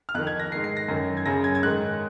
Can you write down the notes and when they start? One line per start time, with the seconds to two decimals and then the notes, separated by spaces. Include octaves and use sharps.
0.09 F6
0.15 F2 D#3 F#6
0.27 G#6
0.40 A#6
0.52 G#2 D#3 C7
0.64 C7
0.77 A#6
0.88 F#2 D#3
1.17 G#6
1.26 F#2 C#3 A#6
1.44 G#6
1.55 G#6
1.63 G#2 D#3 F#6